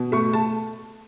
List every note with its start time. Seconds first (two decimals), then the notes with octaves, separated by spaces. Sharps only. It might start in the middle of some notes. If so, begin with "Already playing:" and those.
Already playing: B2
0.12 A3 C#6
0.33 A3 A5